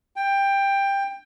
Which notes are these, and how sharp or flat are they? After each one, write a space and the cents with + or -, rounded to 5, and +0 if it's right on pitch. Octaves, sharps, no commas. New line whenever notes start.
G5 +15